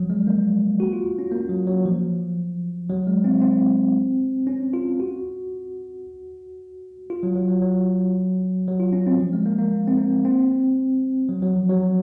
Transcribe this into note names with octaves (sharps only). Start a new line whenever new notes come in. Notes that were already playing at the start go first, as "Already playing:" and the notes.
Already playing: F3 F#3
G#3
A#3
F#4
F4
C#4
A#3
F#3
F#3
F3
F#3
G#3
C4
C4
C#4
F4
F#4
F4
F#3
F#3
F#3
F#3
F#3
F4
C#4
C4
F3
G#3
A#3
A#3
C4
A#3
C4
F#3
F#3
F3
F#3